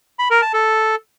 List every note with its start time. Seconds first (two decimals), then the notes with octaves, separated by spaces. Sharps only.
0.19 B5
0.30 A#4
0.42 A5
0.53 A4